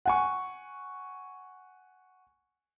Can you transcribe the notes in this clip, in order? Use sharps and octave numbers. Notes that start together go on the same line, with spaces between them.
F#5 G#5 C#6